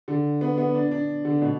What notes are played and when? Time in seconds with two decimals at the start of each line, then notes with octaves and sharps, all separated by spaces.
0.08 D3
0.41 B3
0.58 B3
0.75 D4
0.91 D4
1.25 D3
1.42 B2